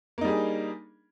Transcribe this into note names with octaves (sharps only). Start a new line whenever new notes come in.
G3 A#3 D4 D#4 G#4